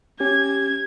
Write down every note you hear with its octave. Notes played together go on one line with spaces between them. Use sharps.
C#4 G4 G#6